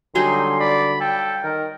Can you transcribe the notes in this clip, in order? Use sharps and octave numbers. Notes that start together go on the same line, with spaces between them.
D3 F#3 G3 D#4 G#5 C6
D5 B5
A4 G5
D#3 A#4